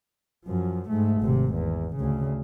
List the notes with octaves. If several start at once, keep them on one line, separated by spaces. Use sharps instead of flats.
F#2 F3
G#2 A3
G#1 C3
E2
D2 C#3